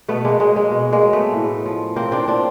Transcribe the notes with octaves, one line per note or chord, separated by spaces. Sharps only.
B2 A3 B3
G#3 A#3
F#3 G#3
G#3
B2
G#3 A#3
F#3
A3 B3
A2
F3
A2 A#3 C4
C4 D4
F3 C4 D4